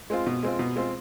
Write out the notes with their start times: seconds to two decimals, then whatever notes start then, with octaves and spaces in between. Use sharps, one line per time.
0.10 G#3 C4 F4
0.26 B2
0.43 G#3 C4 F4
0.59 B2
0.76 G#3 C4 F4